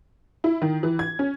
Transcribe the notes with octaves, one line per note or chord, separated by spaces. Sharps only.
E4
D#3
E3
G#6
C#4